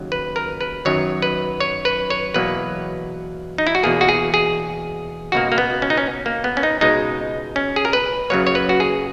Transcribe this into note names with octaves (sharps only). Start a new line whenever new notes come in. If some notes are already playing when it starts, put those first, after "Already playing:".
Already playing: D#2 C#3 F#3
B4
A#4
B4
F#2 D#3 F#3 C#5
B4
C#5
B4
C#5
E2 B2 F#3 A#3 B4
D#4
E4
F#4
E2 B2 A#3 G#4
F#4
G#4
G#4
C#2 B2 A#3 F#4
A#3
B3
C#4
D#4
C#4
A#3
B3
C#4
D#4
C#2 B2 G#3 D#4
C#4
G#4
A#4
B4
F#2 C#3 F#3 A#3 C#5
C#5
B4
F#4
G#4